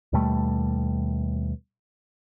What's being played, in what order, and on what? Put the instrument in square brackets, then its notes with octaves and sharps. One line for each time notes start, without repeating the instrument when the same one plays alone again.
[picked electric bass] D#2 B2 G3 A3